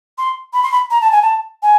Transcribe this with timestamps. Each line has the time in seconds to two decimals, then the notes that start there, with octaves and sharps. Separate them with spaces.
0.18 C6
0.53 B5
0.63 C6
0.72 B5
0.90 A#5
1.01 A5
1.11 G#5
1.22 A5
1.62 G#5